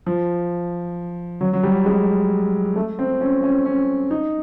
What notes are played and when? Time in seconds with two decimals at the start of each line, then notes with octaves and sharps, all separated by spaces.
0.06 F3
1.41 F#3
1.53 F#3
1.63 G3
1.86 G#3
2.76 A3
2.99 C4
3.21 C#4
3.43 C#4
3.65 C#4
4.11 D#4